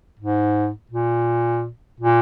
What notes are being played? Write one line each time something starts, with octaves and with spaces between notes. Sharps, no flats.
G#2
A#2
A#2